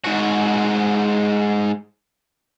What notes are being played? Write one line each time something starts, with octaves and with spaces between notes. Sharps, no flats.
G#2 F#4